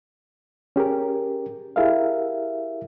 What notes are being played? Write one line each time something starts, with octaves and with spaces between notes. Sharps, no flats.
C#4 G4 G#4 A#4
E4 G4 G#4 A#4 E5 F5